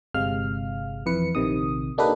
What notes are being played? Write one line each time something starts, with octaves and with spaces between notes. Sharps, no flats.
G1 C3 G#3 F5 F6
F2 E3 B4 C#7
A#1 C3 D#3 D#6
A#3 D4 D#4 G4 A4 B4